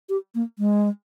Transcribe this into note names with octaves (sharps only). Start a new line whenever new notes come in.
G4
A#3
G#3